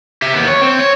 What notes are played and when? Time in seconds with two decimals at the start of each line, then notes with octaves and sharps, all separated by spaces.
0.22 G4 E5
0.33 D#2 B3
0.48 C#5
0.62 C4
0.79 C#5